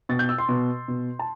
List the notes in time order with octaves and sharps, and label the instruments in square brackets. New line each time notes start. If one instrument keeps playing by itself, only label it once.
[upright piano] B2 A6
G6
E6
C6
B2
B2
A5